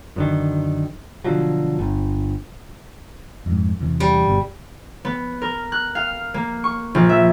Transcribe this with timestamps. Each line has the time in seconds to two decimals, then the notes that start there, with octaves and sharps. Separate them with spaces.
0.16 F#2 D3 D#3
1.24 B2 D3 F3 F#3
1.79 G1
3.46 F2 G#2
3.80 E2 C3 E3
4.00 G3
4.26 G1 B2
5.05 B3
5.42 A#4
5.72 F#6
5.95 F5
6.34 A#3
6.64 C#6
6.95 A#1
7.09 E5